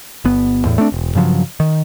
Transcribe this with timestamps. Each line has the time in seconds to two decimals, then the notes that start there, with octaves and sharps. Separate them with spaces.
0.25 G1 B3
0.65 E2 A2
0.78 A3 C4 D4
0.92 E1
1.15 G2 C#3 F3 F#3
1.60 D#3